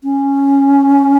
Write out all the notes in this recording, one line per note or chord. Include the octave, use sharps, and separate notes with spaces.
C#4